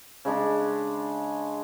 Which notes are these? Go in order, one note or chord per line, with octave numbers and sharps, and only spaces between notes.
C#3 G#3 D4